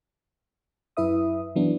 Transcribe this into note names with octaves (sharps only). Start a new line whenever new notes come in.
F#2 E4 B4 E5 D#6
E3 F#3 B3 D4